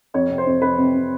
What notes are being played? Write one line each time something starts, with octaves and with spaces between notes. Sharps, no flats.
F2 C#5
C3
C5
F2
F2 B4
C3
C3